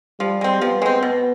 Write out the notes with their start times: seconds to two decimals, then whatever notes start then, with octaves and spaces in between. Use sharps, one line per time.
0.20 F3 G3
0.41 G#3 C4
0.61 F3 B3
0.82 G#3 C4
1.03 B2 B3